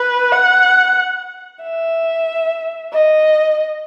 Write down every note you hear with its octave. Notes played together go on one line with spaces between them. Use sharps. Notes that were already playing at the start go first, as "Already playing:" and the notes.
Already playing: B4
F#5
E5
D#5